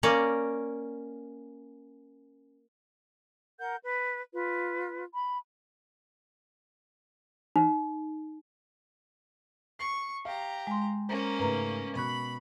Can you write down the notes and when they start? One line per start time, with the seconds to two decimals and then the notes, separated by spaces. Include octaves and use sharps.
0.03 A#3 C#4 D5
3.58 A#4 F#5 G6
3.84 B4
4.34 F4 B4
5.14 B5
7.56 D#4
9.79 C#6 C7
10.25 G4 F5 A#5
10.67 G#3 C6
11.09 A#3 C#4 C5 A#5
11.39 G#2 C#3 A3 B4 A#5
11.95 B2 B5 C#6 F#6